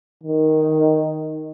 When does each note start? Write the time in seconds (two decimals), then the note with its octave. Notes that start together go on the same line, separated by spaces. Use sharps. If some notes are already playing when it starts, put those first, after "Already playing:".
0.23 D#3